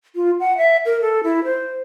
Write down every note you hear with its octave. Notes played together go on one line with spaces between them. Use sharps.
F4
F#5
E5
A#4
A4
E4
C5